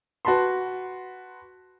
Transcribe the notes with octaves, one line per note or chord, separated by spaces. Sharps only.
F#4 B4 A5 B5 C6